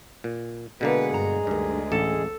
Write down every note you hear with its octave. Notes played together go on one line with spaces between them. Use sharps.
A#2
B2 D3 G#3 A#3 G#4 B4 F#5
G2 A#5
D2 G2 D#3
A1 A4